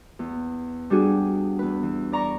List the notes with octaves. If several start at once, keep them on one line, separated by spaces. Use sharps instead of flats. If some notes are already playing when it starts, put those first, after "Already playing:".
E2
G3 D4 F#4 G#4
E2 B4
E3
D5 A#5 C#6